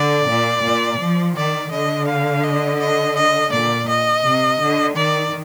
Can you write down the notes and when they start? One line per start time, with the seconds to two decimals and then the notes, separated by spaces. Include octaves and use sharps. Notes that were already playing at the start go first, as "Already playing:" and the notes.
Already playing: D3 D5
0.28 A#2
0.63 A#2
1.00 F3
1.36 D#3 D5
1.72 D3 D#5
2.08 F5
2.44 D#5
2.80 D#5
3.16 D#5
3.52 A#2 D5
3.89 D#5
4.25 C3
4.61 D3
4.96 D#3 D5